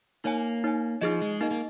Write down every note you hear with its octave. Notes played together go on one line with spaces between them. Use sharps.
A#3 D#4 C#5 G#5
D#4 C#5 G#5
F3 D#4 G#4 D#5
G#3
A#3 D#4 G#4 D#5
A#3